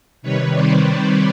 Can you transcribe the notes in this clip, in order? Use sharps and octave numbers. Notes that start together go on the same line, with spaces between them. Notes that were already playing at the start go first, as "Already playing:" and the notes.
C3 D#3 G3 B4 C#5
C5 D5
B4 C#5